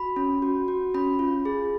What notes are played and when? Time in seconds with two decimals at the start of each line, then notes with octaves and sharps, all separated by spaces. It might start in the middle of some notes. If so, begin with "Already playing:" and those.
Already playing: F#4 B5
0.16 C#4
0.42 F#4
0.68 F#4
0.94 C#4 B5
1.19 F4
1.45 G#4